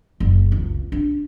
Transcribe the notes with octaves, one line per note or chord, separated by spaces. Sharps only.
F#1
C#2
D4